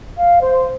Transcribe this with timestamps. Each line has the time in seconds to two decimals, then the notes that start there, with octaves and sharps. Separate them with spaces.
0.16 F5
0.41 C5